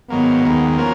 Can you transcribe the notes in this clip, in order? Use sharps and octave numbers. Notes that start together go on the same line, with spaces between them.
G#2 D#3 F#3 A#3 B3
D#2 D#3 G#3
F3 A#3 C#4 F#4 A#4